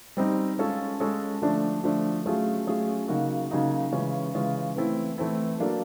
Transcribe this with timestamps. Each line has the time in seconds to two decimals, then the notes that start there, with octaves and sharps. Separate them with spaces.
0.17 G3 C4 D#4
0.58 G#3 C#4 F4 A4
1.00 G#3 C#4 F4 A4
1.42 D3 F3 A3 D4
1.84 D3 F3 A3 D4
2.26 F#3 A3 C#4 F4 G#4
2.67 F#3 A3 C#4 F4 G#4
3.08 C#3 F#3 A#3 D#4 F#4
3.50 C#3 F#3 A#3 D#4 F#4
3.92 C#3 E3 G#3 C#4 F4
4.34 C#3 E3 G#3 C#4 F4
4.76 E3 A3 C4 E4
5.18 E3 A3 C4 E4
5.60 F#3 A#3 D4 F4 A4